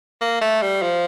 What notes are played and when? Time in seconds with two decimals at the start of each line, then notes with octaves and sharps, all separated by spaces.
0.21 A#3
0.41 A3
0.62 G3
0.82 F3